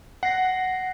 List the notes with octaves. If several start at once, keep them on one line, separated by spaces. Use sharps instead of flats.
F#5 A#6 C7